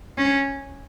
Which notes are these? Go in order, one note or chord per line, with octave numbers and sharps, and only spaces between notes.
C#4